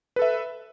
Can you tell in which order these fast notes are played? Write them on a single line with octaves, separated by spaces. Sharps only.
B4 A4 E5